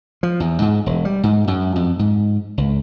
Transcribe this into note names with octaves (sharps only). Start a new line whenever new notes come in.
F3
E2
G#2
E1
G3
G#2
F#2
F2
G#2
C#2